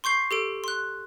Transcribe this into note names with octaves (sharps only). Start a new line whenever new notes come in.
C6 C#6 G6 C7
G4 A4 D7
C6 F#6